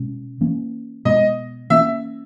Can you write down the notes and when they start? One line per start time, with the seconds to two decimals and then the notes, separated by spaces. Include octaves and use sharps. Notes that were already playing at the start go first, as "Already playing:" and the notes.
Already playing: B2 G#3 C#4
0.41 E3 A#3 C#4
1.05 B2 G#3 B3 D#5
1.70 E3 A#3 C#4 E5